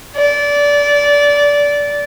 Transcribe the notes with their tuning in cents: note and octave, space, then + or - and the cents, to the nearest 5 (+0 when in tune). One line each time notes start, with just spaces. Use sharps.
D5 -20